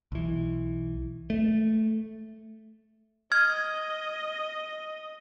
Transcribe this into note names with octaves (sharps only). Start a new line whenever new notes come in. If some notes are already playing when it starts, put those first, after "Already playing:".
B1 E3
A3
D#5 F6 G#6